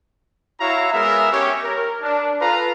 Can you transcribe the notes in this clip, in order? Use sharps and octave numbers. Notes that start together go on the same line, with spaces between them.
E4 F#4 C#5 E5 F5 A#5
G#3 B3 G#4 A#4 E5
C#4 G4 C#5
A#4
D4
F4 A4 B4 F5 A#5